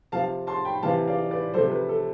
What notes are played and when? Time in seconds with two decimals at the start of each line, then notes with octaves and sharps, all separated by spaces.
0.12 C3 F3 F5 A5
0.47 A5 C6
0.65 G5 B5
0.82 C3 E3 F5 A5
1.07 D5 F5
1.31 B4 D5
1.54 F3 A4 C5
1.58 C3
1.72 B4
1.89 A4